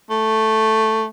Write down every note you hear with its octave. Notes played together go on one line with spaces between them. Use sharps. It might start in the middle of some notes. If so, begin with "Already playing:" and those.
A3